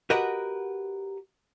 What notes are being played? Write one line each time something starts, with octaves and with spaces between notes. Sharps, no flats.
F#4 G4 A#4 B4 D#5 F#5